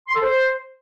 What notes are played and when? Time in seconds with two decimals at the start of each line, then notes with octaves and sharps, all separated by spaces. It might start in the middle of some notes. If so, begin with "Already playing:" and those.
0.08 C6
0.14 A4
0.21 C5